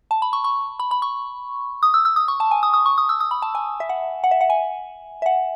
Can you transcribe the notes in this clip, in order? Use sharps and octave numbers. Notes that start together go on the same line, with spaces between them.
A5
B5
C#6
C#6
B5
B5
C#6
D#6
E6
E6
D#6
C#6
A5
G#5
D#6
D#6
C#6
D#6
E6
D#6
B5
A5
G#5
E5
F#5
F#5
E5
F#5
G#5
E5
F#5